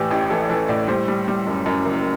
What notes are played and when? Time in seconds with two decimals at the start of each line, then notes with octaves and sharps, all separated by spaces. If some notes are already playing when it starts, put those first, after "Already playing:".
Already playing: A2 E3 G4 D5
0.11 A1 G4
0.30 E3 A4
0.49 E3 A4
0.68 A2 D5
0.88 G3 C5
1.08 G3
1.28 G3
1.47 F#2
1.66 F#2
1.85 F#1